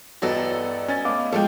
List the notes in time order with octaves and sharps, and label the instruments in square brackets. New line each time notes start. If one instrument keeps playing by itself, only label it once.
[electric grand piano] E2 A4 [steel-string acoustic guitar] G2 D5 D#5 [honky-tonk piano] F#3 B3
[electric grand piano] C#4 G#5 A6
[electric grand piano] A3 B3 [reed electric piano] D#5 F5 D6
[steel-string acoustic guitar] F3 G#3 [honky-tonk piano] A4 G5